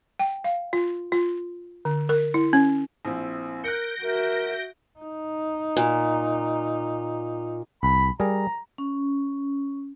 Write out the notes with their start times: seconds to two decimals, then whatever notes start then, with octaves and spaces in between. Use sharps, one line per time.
0.20 G5
0.44 F5
0.73 F4
1.12 F4
1.85 D3
2.09 A#4
2.34 E4
2.53 C#4
3.05 A#1 C4 E4
3.64 A#4 F#6 G6 A#6 C#7 D7
4.02 F#4 A#4 E5
5.00 D#4
5.77 A#2
7.83 C2 B5
8.20 G3 G#4 A#4 A#5
8.78 C#4